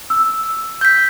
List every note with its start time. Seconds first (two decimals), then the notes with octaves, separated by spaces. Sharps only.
0.10 E6
0.81 G6 B6